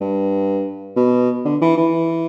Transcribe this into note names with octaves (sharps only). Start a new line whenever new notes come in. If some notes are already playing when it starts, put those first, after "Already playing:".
G2
B2
D3
E3
E3